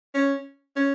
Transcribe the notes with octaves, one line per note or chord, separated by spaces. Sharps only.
C#4
C#4